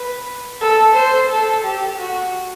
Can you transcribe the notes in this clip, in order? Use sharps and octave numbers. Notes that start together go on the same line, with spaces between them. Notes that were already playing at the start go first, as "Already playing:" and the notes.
Already playing: B4
A4
C5
A4
G4
F#4